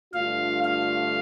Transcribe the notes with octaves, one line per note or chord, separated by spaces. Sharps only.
G2 D3 A3 D4 F4 F5
F5